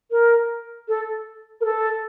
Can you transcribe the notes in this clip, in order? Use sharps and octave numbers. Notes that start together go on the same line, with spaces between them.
A#4
A4
A#4
A4